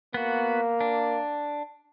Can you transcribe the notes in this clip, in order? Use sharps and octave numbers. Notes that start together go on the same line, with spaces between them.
A#3 B3 F#4
D4